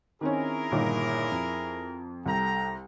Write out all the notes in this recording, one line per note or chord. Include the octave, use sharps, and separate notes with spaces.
D#3 C4 C#4 E4 G#4 A#4
G1 A#2 D#3
F2
C2 A4 G5 A#5